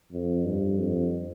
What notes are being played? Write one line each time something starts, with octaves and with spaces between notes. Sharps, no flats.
F2
G2
F2